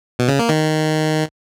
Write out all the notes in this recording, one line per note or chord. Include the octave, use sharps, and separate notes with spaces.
B2
C#3
A#3
D#3